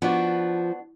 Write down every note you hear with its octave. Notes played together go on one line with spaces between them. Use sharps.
F3 B3 D4 F#4